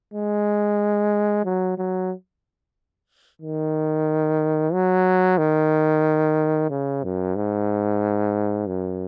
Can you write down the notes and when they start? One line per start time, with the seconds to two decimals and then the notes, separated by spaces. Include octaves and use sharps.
0.14 G#3
1.45 F#3
1.78 F#3
3.41 D#3
4.73 F#3
5.38 D#3
6.70 C#3
7.03 F#2
7.36 G#2
8.67 F#2